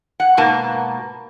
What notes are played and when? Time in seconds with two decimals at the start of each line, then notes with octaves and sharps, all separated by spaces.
0.20 F#5
0.37 G#2 B2 A#3 A5